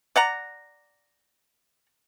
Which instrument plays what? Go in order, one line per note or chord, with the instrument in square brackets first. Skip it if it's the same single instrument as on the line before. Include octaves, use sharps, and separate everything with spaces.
[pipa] D5 F#5 A#5